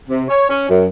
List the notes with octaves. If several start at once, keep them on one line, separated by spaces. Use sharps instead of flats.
C3
C#5
C#4
F#2